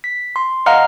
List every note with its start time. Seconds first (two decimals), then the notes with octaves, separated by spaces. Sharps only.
0.04 B6
0.36 C6
0.66 D#5 F5 F#5 A#5 F6